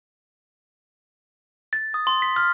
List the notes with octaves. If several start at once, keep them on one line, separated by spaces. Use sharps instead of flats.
A6
D#6
C6
B6
F6